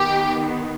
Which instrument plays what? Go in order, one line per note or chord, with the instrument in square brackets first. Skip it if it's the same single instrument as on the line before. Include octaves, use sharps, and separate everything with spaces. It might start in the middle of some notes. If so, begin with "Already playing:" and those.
Already playing: [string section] D#3 B3 G4